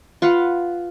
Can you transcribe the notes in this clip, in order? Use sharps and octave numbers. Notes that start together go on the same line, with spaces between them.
F4 B4 F5 F#5